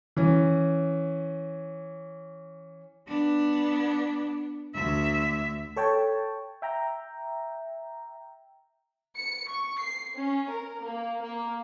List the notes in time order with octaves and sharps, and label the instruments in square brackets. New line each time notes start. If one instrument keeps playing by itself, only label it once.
[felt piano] E3 C#4
[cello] B3 D4
D2 E5
[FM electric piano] A4 C#5 G5 A5
E5 G5 A#5
[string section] C#7
C#6
C7
C#4
A#4
A#3
A#3